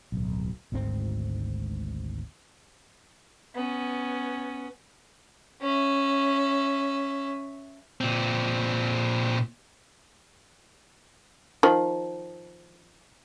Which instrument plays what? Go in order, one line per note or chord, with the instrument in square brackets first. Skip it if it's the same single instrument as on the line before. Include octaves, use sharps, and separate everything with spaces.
[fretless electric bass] D1 B1
G#1 D2 G#2 C4
[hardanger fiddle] B3 C#4
C#4 E5
[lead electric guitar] A#2 C4
[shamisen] D#3 F3